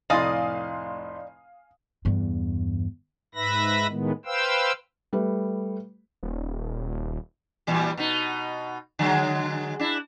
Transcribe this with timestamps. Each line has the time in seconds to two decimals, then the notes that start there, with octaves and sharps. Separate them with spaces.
0.10 F1 A2 D5 D#5 F5 G#5 C6 D#6
2.05 E2 G2
3.35 G#2 B4 E5 B5 A#6
3.89 A2 D#3 G#3 B3
4.26 B4 C5 F5 G5 E6
5.13 G3 A3 B4
6.23 D#1
7.67 A#2 E3 G3
7.97 B2 D#4
8.99 D3 F#3 G#3
9.80 D4 E4